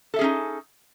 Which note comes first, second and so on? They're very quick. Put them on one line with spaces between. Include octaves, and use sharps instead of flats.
A4 E5 G#4 C#4 D#4